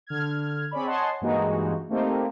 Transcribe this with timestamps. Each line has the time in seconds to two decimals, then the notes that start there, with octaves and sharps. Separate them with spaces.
0.07 D3 F6 G#6
0.71 C4 G#4 C#5 D5 B5
0.86 C#5 D#5 F#5 G#5 A5 C6
1.21 G2 E3 G#3 A#3 D#4 F#4
1.89 A3 A#3 C4 D#4 G4